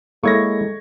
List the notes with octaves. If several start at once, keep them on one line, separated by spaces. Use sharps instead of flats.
G#3 A#3 E4 A4 C#5 C#6 G#6 A#6